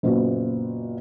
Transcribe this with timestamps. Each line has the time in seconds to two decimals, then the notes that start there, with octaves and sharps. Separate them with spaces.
0.03 F#1 A#2 B3 F#4